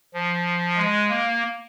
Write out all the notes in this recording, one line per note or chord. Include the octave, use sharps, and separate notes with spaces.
F3
G#3
A#3